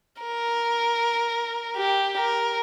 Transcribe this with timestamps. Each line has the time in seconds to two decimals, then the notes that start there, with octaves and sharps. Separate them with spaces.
0.22 A#4
1.77 G4
2.15 A#4